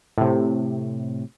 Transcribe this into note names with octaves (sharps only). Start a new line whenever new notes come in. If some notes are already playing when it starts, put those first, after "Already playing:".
A2 C3